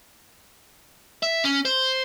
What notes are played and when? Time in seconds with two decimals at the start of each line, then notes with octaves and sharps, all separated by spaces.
1.23 E5
1.44 C#4
1.65 C5